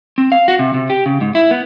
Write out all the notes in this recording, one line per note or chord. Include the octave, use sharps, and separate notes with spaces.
C4
F5
F#4
C3
C3
G4
C#3
G#2
E4
B3